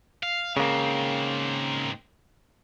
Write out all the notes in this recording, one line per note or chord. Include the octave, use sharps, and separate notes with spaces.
F5
G#2 C#3 A#3 C4